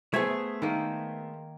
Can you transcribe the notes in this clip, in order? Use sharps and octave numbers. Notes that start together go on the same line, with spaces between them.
A3 B3 G#4 C5 G#6
D#3 A#3